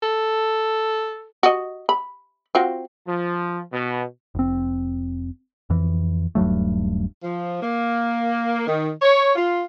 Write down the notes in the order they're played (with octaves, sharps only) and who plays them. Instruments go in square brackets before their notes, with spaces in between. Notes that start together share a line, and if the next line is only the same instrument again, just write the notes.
[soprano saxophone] A4
[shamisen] F#4 D#5
B5
C4 F4 F#4
[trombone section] F3
B2
[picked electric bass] F1 C4
F2 E3
D#1 G2 F#3 A3
[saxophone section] F3
A#3
D#3
C#5
F4